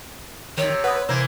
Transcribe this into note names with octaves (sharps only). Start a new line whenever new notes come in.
C3 D#3 C#5
B4 F#5 D#6
C3 E3 A#3 C5